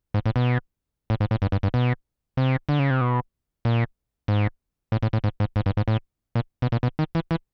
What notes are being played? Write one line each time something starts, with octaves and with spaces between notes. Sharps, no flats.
G#2
A2
B2
A2
G#2
A2
G2
G2
G2
B2
C3
D3
C#3
C3
B2
A#2
G#2
A2
A2
A2
G#2
G#2
G#2
G2
G#2
A2
A#2
B2
A#2
B2
D#3
E3
E3